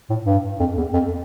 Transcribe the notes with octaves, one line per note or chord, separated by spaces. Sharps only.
A2
G2
F2
E2
F2